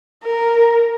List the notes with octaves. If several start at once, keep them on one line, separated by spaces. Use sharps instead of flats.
A#4